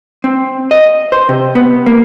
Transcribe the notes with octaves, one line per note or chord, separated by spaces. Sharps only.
C4
D#5
C5
C3
B3
A#3